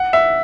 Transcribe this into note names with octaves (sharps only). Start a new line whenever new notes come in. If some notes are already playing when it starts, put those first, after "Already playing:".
Already playing: F#5
E5